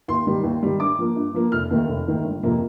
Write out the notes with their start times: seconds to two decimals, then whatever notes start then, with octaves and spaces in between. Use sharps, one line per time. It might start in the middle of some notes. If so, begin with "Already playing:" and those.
0.08 D#2 C6
0.27 D#3 G3
0.44 D#2
0.62 D#3 G3
0.80 G2 D6
0.99 F3 A#3
1.16 G2
1.34 F3 A#3
1.52 F1 F6
1.71 D#2 D#3 A3
1.89 F1
2.07 D#2 D#3 A3
2.24 G1
2.43 F2 C3 F3 A#3